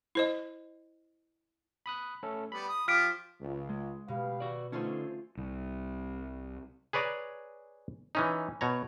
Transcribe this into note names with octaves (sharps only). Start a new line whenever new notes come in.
E4 C5 D#5
B5 D#6 F#6
A3 C#4 A4
G3 B3 B5
D#6
F3 F4 G4 F6 B6 D7
C#2
G#3
B2 G4 B4 F5
F#4 D5
D3 A3 C#4 D#4 F4 G#4 C5
C2
G#4 B4 C#5 D5 G#5 A#5
E3 C#4 D#4
B2 C#5 A#5